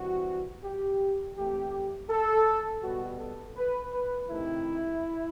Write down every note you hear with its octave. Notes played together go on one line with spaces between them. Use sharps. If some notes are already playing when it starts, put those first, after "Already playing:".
Already playing: E3 G3 C4 F#4
G4
A2 E3 A3 C4 G4
A4
B2 G3 B3 F#4
A4
B4
B4
C3 D#3 A3 C4 E4